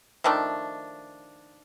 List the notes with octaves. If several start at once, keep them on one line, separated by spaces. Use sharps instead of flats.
D#3 F3 A3 D4